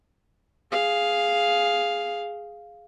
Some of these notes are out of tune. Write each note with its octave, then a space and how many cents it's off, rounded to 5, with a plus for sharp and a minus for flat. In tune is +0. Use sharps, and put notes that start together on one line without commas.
G#4 +0 F5 +0